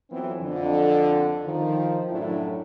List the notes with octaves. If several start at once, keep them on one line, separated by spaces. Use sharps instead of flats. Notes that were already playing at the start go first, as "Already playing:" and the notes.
F2 E3 F#3 B3 C4
F2 D3
D#3 F3
F#2 A2 F#3 D4 E4